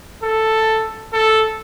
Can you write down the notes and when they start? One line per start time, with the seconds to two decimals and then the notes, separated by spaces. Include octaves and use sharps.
0.23 A4
1.13 A4